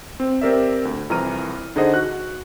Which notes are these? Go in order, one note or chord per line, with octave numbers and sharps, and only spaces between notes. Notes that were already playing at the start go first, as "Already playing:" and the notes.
C4
C4 G4 A#4 D5 E5
D2
C2 F2 E3 A#5 F6 D#7
D3 D#4 G#4 C5 D#5 F#5
F#4 F#6